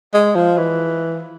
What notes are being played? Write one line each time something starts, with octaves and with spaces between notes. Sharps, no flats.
G#3
F3
E3